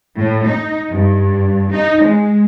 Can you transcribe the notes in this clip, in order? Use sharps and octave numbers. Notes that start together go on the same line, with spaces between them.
A2
D#4
G2
D#4
G#3